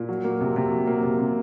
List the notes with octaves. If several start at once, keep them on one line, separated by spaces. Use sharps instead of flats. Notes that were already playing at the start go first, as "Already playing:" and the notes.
Already playing: A#2
F#3
A#3
C3
C3
F#3
A#3
C3
C3